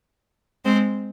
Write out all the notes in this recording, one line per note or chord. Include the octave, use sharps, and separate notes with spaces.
G#3 C4